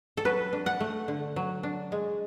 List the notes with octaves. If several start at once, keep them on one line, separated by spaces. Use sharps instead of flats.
A4
F#3 B4
D4
F#5
A3
D3
F#3
D4
G#3